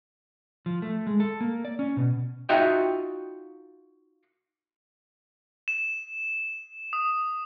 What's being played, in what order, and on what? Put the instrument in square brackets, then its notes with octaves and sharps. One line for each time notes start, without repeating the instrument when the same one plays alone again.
[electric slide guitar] F3
A3
G#3
A4
A#3
D5
C#4
B2
[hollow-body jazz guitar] D#4 F4 F#4 D#5 E5 G5
[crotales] E7
D#6